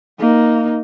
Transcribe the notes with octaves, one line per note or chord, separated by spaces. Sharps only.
A#3 D#4